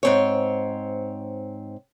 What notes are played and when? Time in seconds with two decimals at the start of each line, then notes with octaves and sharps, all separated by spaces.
0.03 G#2 C4 C#5